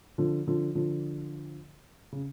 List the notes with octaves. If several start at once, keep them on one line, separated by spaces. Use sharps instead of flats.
D3 F3
D3 F3
D3 F3
C#3